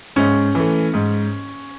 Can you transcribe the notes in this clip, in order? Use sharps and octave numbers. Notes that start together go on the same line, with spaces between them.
G#2 C#4
E3 A3
G#2